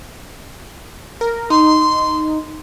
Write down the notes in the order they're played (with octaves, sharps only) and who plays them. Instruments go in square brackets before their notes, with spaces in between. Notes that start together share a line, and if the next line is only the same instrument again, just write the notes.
[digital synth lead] A#4
[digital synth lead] D#4 [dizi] C6